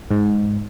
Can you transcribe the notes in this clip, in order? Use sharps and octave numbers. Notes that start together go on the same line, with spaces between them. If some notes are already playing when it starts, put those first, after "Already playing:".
G#2